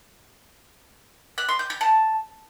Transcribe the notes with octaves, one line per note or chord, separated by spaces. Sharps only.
F#6
C6
G6
G6
A5